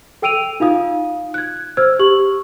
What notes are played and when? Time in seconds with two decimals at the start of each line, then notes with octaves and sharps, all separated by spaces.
0.22 A4 G5 E6 D7 D#7 F7
0.60 D#4 F4 F5 D#6
1.34 F#6 G#6
1.77 C5 E6 F6 G#6
1.99 G4 C#6 F#7